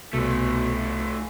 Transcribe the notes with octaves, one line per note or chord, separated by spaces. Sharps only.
C2 B2 F3 A3